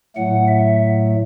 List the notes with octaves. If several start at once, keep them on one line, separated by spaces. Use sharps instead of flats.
A2 F#3 A3 F#5
E5